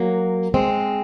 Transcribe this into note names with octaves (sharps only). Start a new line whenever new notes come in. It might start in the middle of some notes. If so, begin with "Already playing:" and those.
Already playing: F#3 A#3
G#3 C4